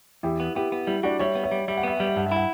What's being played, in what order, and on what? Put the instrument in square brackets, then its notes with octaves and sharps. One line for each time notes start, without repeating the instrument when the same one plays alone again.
[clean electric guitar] E2 [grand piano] E4 G4
[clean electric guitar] B3
[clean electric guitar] B3 [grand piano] E4 G4
[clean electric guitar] B3
[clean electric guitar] G3 [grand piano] E4
[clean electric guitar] G3 [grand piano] D4 F#4
[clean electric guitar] G3 [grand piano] C#5 E5
[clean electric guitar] B3
[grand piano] C#5 E5
[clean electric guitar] G3
[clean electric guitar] G3 [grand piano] E5
[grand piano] F#5
[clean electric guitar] B3 [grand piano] E5
[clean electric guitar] G3 [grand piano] F#5
[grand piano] E5
[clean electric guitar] G2 [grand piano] F#5
[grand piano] E5
[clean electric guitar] E4 [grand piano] F#5